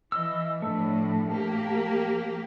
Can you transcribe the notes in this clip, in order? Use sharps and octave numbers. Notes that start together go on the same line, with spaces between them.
E3 D#5 E6
A2 F3 A3 D4
F3 A#3 G4